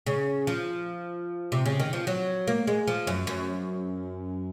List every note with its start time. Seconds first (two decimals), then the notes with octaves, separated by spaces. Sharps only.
0.07 C#3
0.47 F3
1.52 C3
1.66 C#3
1.80 D#3
1.93 F3
2.07 F#3
2.47 A#3
2.67 G#3
2.88 F3
3.07 F#2
3.27 F#2